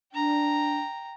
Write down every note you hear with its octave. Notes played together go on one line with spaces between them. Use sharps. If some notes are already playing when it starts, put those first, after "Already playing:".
D4 G5 A#5